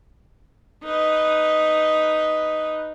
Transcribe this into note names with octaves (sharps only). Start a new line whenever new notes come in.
D#4 B4